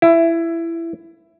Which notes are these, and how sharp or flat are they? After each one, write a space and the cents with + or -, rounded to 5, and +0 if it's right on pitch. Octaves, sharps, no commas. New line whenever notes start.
E4 +15